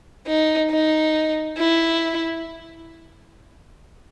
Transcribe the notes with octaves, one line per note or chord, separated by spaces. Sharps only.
D#4
D#4
E4